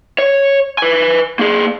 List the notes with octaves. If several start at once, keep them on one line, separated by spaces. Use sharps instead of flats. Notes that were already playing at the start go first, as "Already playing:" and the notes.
C#5
B4 G#5
A#3 G#4